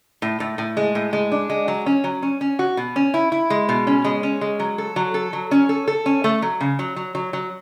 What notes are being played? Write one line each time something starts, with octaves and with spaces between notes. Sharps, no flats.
A2
A2
A2
G#3
A2
G#3
D4
G#3
F#3
C#4
F#3
C#4
C#4
F#4
B2
C#4
E4
E4
G#3
B2
C#4
G#3
C#4
G#3
F#3
A4
F#3
A4
F#3
C#4
A4
A4
C#4
A3
F#3
C#3
F#3
F#3
F#3
F#3